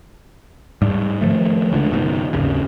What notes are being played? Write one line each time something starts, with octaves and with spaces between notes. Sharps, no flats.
G#2 G3
D#3 F3 A3
C#2 D3
F#1 B2 D#3
D#1 G#1 D#2 C#3